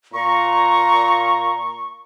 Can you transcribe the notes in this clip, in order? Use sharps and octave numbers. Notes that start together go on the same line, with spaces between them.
A#2 A#5 C#6